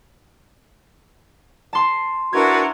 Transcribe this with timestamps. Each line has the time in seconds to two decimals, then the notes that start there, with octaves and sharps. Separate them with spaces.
1.73 A5 C6
2.33 D4 E4 F#4 A#4 B4 G#6